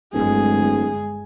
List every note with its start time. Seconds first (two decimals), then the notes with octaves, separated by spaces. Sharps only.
0.13 D1 G1 G#3 G#4